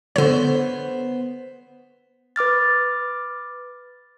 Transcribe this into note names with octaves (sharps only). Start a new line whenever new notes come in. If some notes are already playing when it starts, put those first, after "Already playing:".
D3 B3 C5 C#5
B4 D6 F6 A6